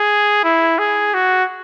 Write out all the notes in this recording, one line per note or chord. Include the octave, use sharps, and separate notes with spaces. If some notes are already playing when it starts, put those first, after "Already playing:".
Already playing: G#4
E4
G#4
F#4